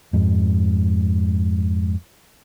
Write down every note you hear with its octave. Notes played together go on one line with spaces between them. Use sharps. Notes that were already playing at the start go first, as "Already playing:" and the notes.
F2 G#2